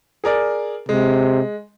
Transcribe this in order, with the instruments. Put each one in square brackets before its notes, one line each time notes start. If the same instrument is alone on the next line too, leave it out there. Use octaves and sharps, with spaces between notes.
[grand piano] G#4 A#4 D5
[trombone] C3 [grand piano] G#3